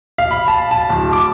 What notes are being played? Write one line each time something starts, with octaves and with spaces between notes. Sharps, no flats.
F5
B5
A5
A5
D1
D6